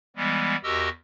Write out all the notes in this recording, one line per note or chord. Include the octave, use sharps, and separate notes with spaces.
E3 G3 G#3 B3
E2 F#4 G4 A#4 D#5 E6